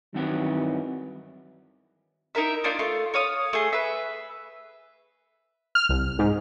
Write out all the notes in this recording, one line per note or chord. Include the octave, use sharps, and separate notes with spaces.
G2 D#3 E3 F#3 C4 F#5
D#4 E4 A#4 E5
A#3 D4 D#4 F4
A3 F4
C#5 F5 D#6
A3 G#4
B4 E5
F6
C2
G#2